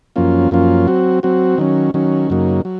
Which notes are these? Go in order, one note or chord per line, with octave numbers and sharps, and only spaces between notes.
F#2 F3 A#3 C#4 F4
F#2 F3 A#3 C#4 F4
F#3 C4 F#4
F#3 C4 F#4
D#3 F#3 C#4
D#3 F#3 C#4
F#2 C#3 F#3 A#3 D#4
F#3